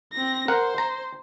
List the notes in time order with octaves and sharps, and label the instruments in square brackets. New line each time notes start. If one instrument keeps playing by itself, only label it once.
[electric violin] C4 A#6
[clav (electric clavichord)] A#4 F#5 [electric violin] C5
[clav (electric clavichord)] A#5